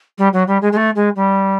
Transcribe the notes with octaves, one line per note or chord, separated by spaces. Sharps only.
G3
F#3
G3
G#3
G#3
A3
G#3
G3